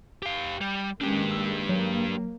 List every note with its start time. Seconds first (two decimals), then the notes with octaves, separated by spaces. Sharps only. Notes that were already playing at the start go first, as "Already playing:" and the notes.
0.23 G4 F5
0.61 G3
1.01 D#3 G#3 A#3 C#4 D4 G4
1.31 E6
1.69 F#3 A#3